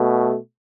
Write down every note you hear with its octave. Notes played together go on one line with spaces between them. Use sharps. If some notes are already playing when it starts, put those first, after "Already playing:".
Already playing: B2 A3